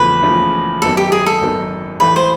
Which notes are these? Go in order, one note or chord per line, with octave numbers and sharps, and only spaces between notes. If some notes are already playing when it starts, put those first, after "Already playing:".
Already playing: F#1 E2 C#3 F3 A3 B4
F#1 E2 C#3 F3 A3
G#1 F#2 D#3 F#3 B3 A4
G4
G#4
A4
G#1 F#2 D#3 F#3 B3
A1 A2 E3 A3 B4
C5